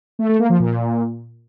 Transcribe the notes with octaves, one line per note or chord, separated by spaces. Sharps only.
A3
A3
A#3
F3
A#2